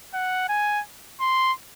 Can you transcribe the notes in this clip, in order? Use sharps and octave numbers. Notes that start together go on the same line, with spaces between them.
F#5
G#5
C6